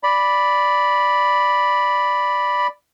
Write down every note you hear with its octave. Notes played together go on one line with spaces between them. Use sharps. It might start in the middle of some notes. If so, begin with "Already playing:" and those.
D5 B5